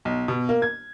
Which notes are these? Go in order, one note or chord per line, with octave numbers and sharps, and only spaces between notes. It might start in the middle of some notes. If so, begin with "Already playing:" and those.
B1
B2
A#3
G#6